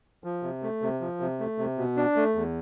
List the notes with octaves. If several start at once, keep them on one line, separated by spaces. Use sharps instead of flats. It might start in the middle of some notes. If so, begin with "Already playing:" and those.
F3
C3
A3
C3
F3
C3
A3
C3
B2
D4
A3
E2